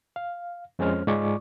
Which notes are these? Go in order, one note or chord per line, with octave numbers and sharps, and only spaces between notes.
F5
F2 G#3 C#4 C5 F6
G#2 G#3 F4 D5 C#6 D6